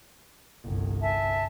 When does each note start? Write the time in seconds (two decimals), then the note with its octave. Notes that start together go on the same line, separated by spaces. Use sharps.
0.63 G1 C2
1.01 E5 G#5 A5